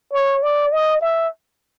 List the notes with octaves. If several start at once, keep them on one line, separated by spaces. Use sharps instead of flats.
C#5
D5
D#5
E5